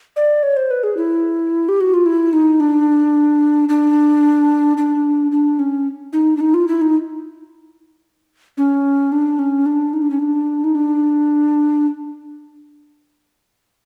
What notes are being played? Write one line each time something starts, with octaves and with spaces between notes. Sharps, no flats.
D5
C#5
C5
B4
G#4
E4
G4
F#4
F4
E4
D#4
D4
D4
D4
D4
C#4
D#4
D4
D#4
F4
E4
D#4
C#4
D4
C#4
D4
D#4
D4
C#4
D4
D#4
D4